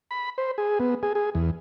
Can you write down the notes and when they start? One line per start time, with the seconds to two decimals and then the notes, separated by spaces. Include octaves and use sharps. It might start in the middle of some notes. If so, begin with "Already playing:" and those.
0.11 B5
0.38 C5
0.58 G#4
0.80 B3
1.03 G#4
1.15 G#4
1.35 E2